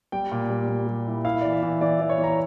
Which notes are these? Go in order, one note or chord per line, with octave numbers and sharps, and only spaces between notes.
G3 G5
A#2
G3
G3
G3
E4
E4 F5
E3 D5
E5
E3
E3 D5
E3 D5
C#5
E3
A#5